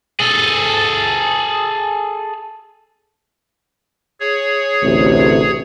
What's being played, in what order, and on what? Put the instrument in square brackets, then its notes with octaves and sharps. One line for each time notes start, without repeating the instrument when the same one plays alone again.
[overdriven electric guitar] G#4 A4
[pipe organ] G#4 C#5
[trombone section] A1 D2 C3